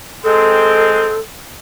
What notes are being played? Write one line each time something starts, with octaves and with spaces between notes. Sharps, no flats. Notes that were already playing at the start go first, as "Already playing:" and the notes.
G#3 C4 A4